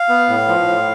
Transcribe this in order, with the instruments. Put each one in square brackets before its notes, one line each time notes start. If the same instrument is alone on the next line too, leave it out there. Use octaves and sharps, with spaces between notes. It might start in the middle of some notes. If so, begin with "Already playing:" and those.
Already playing: [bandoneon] F5
B3
A2
F3
A2